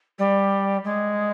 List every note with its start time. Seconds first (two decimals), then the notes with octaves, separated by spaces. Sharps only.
0.18 G3
0.84 G#3